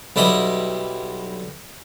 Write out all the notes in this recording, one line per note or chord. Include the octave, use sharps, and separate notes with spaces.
B1 G3 E4 D#5 B5